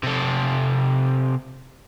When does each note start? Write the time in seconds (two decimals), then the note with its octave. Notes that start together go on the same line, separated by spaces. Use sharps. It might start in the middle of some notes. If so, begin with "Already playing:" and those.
0.03 C3 A4